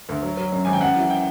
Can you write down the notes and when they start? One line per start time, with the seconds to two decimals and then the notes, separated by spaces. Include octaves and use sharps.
0.09 D2
0.23 F#3
0.37 F#3
0.52 F#2
0.65 G#1 G#5
0.73 G5
0.81 F#2 F#5
0.96 E3
1.10 G5